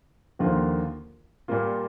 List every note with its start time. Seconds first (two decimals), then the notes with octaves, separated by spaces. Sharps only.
0.39 D#2 D3 F3 A#3 F4
1.48 A#2 G3 A#3 F4